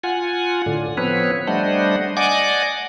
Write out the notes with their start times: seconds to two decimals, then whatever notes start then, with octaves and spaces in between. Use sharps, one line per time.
0.04 F4 F#5 G#5
0.66 A2 D3
0.97 F3 B3 C4 B4 C#5
1.47 G3 A3 D4 C5 D#5 F#5
2.17 D5 D#5 F#5 G#5 D6